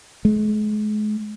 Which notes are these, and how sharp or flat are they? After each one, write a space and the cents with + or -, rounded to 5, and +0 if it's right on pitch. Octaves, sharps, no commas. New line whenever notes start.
G#3 +40